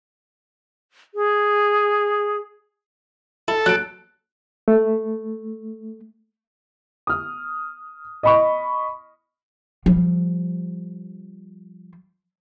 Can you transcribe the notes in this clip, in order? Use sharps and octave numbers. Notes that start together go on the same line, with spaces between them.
G#4
E4 A4
F#3 F#6 D7
A3
D#6 F6
D#5 B5 C#6
F3 G3